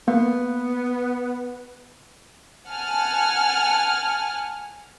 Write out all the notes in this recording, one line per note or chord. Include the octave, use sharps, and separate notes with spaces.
A#3 B3
F#5 G#5 A5 F6